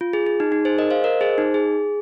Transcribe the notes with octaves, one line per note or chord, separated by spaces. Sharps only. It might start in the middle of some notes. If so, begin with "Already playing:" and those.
F4
G#4
G#4
D#4
D#4
G#4 C5
A#4 D#5
C5 F5
A#4 D#5
G#4 C5
D#4
G#4